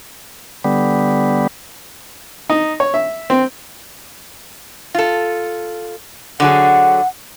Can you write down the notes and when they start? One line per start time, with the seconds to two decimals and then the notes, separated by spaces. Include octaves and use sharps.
0.64 D3 G3 B3
2.50 D#4
2.80 C#5
2.94 E5
3.30 C4
4.94 F4 A4
6.40 D3 F#3 G#4 F#5